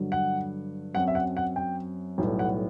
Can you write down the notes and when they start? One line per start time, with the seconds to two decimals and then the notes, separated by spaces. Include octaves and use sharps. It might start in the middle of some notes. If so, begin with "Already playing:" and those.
Already playing: G2 D3 F#3
0.12 F#5
0.94 F#2 F#3 C4 F#5
1.08 E5
1.15 F#5
1.37 F#5
1.56 G5
2.18 B1 A2 G3 B3
2.39 F#5